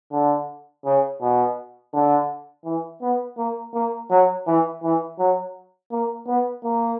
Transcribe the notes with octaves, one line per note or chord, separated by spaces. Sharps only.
D3
C#3
B2
D3
E3
B3
A#3
A#3
F#3
E3
E3
F#3
A#3
B3
A#3